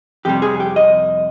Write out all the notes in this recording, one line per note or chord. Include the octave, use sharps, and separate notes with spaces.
F2 C3 G3 G4
G#4
G4
D#5